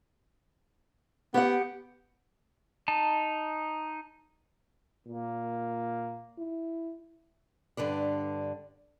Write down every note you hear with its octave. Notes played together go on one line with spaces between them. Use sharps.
B3 G4 F#5
D#4 A5
A#2 A#3
E4
G2 D3 B4 D5